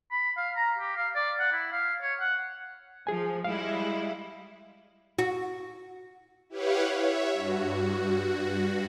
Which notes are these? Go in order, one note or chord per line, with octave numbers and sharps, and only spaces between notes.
B5
F5
A#5
G4
F5
D5
F#5
E4
F5
C#5
F#5
F3 G#4 G#5
G3 G#3 E4 F5
F#4
E4 G4 B4 C#5 F5 F#5
C#5 E5
G2 F#4